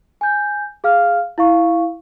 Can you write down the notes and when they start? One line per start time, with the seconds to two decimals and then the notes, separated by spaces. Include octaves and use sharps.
0.21 G#5 G6
0.84 G#4 F5 F6
1.38 E4 F5 C#6